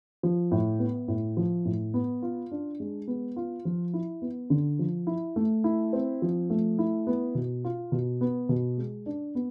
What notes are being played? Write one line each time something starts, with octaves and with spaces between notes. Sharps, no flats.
F3
A2
B3
A2
F3
A2
B3
F4
D4
G#3
B3
F4
F3
E4
B3
D3
F3
E4
A3
E4
C4
F3
A3
E4
B3
B2
F4
B2
B3
B2
G#3
D4
B3